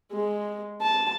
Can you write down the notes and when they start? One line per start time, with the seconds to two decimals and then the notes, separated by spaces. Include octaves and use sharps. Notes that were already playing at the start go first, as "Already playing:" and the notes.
0.12 G#3
0.82 A5